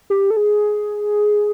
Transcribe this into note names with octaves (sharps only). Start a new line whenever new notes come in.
G4
A4
G#4